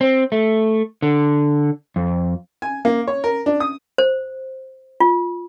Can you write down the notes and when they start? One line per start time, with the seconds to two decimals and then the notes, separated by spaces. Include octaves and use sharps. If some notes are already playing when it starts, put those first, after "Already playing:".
0.01 C4
0.32 A3
1.02 D3
1.96 F2
2.62 G#5
2.85 A#3
3.07 C#5
3.24 A#4
3.46 D4
3.60 D#6
3.98 C5
5.00 F4